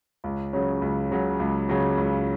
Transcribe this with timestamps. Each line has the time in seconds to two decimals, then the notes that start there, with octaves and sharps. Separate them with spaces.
0.24 C#2
0.53 C#3 F#3 C#4
0.81 C#2
1.11 C#3 F#3 C#4
1.40 C#2
1.69 C#3 F#3 C#4
1.97 C#2